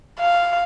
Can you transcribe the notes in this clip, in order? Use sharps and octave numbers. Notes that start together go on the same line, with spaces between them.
F5